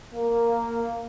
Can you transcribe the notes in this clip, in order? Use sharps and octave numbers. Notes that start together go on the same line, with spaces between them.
A#3